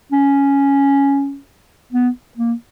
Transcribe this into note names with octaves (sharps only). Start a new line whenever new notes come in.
C#4
B3
A#3